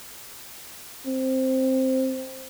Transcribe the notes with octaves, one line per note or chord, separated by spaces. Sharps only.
C4